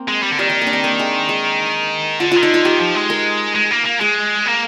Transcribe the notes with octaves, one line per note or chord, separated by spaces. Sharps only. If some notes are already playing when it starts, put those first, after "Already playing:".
Already playing: A#3 C4
G#3
G3
D3
D#3 G3
G3
A#3
D4
C4
A#3
G#3
G#3
D3 F4
D#3 F4
D3 D#4
F4
D#3 G4
F3
G#3
A#4
G#3
A#3
A#3
G#3 G#4
A#3